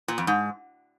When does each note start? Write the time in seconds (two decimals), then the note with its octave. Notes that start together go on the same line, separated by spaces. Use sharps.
0.08 A#2
0.18 F2
0.27 G#2